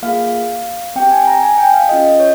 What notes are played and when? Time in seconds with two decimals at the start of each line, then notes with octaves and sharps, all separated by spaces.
0.02 A#3 F4 G#4 F5
0.96 C4 G4 G5
1.11 G#5
1.27 A#5
1.43 G#5
1.58 G5
1.74 F5
1.89 C#4 F4 G#4 D#5
2.04 D#5
2.20 C#5